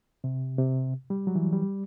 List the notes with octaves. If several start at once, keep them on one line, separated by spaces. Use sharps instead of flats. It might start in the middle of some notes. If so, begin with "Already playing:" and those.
C3
C3
G3
F#3
E3
G3